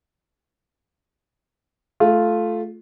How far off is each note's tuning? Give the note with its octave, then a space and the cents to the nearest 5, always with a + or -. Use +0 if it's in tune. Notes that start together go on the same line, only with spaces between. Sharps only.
A3 -10 F4 +0